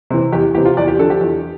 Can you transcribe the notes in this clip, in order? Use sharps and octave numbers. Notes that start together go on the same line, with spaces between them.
C3 E3
E2 G4
C3 E3 G4
F4
E2 D5
G4
D3 F3 A4
G4
E2